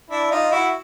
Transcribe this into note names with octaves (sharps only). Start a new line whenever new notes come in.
D4 E4
D#4 F4
E4 F#4